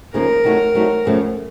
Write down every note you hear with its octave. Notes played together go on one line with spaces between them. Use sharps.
C#3 F3 A#3 D#4 A#4
C3 F#3 A3 D#4 F#4
C3 F#3 A3 D#4 F#4
F#2 C#3 F3 A3 C#4